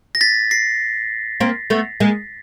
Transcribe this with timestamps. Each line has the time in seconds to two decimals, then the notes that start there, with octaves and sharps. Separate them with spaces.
0.15 A#6
0.21 A6 B6
0.51 A#6 C7
1.40 A#3 C4
1.70 A3 B3
2.00 G#3 A#3